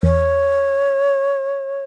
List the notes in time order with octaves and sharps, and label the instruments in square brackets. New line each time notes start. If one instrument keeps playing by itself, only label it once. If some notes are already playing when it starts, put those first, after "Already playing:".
[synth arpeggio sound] E2 [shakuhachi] C#5